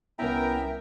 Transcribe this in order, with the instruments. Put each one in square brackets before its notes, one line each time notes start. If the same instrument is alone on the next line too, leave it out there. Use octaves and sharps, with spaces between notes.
[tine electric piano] C2 C#4 E4 [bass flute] B3 [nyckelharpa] A#4 [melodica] E5 G5 A#5